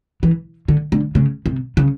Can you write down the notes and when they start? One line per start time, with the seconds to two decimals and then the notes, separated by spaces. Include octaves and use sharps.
0.23 E3
0.68 D3
0.92 D3
1.15 C#3
1.46 C3
1.77 C#3